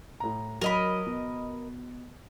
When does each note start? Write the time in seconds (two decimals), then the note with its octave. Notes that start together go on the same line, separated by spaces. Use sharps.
0.20 A2 A#5
0.61 F#3 A#4 D#5 B5
1.06 B2